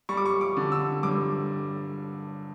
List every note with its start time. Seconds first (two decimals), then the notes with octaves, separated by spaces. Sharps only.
0.09 G3 C#6
0.17 D6
0.26 C#6
0.41 D6
0.57 D3
0.72 E6
1.03 G2 D6